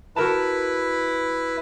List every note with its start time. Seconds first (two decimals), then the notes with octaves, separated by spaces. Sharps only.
0.16 E4 F#4 A#4 B4 A5